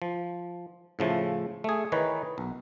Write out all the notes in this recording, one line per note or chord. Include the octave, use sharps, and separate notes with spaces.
F3
A2 C#3 F3 A3
A3 G#4
D#3 E3 D#4 B4 C#5
B1